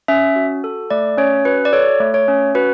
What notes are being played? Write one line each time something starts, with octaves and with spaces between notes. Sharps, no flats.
C#4 E5
F#4
A4
A3 D5
C#4 C#5
F#4 B4
D5
A4 C#5
A3
C#5
C#4
F#4 B4